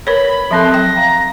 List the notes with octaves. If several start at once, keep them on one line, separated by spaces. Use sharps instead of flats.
A#4 B4 C#5 B5
F3 C4 A4 E5 A5 C6 F#6
F#3 G5 A#6
F5 A#5